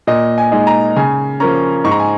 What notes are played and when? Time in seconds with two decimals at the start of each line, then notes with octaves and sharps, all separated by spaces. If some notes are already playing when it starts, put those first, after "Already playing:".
0.07 A#2 D#5
0.38 G#5
0.52 G#3 D#4
0.67 A#5
0.96 C#3 G#5
1.40 F3 A#3 C#4 A#5
1.84 G#2 C#6
1.92 A#5
2.00 G#5